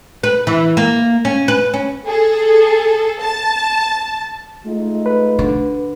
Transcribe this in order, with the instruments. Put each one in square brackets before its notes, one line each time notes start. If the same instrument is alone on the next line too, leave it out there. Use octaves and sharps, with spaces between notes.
[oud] B4
E3
A#3
C#4
B4
C#4
[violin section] G#4 A4
A5
[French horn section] G#3 D#4 F4 [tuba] A3
[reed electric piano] B4
[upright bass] D3